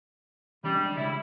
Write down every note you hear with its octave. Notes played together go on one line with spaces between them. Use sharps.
D#3 E3 G3 C#4
G#3 D4 D#5
C#3 G#3 E4